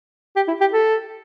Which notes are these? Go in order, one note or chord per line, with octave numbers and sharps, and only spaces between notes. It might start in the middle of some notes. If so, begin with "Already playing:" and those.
G4
E4
G4
A4